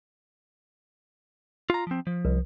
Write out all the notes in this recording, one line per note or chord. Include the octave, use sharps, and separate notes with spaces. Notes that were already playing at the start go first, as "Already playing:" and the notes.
F4 A#5
F3 C4
F3
C2